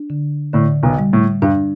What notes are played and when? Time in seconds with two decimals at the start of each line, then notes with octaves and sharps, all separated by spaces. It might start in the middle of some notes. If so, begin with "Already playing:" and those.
Already playing: D4
0.10 D3
0.53 A2 D3
0.83 B1 B2
0.99 G3
1.13 A2
1.42 G2 D4